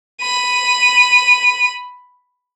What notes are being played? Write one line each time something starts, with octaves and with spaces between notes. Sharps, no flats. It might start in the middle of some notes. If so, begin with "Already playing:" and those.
B5 D#7